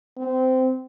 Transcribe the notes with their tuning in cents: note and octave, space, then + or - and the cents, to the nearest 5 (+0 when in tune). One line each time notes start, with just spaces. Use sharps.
C4 -20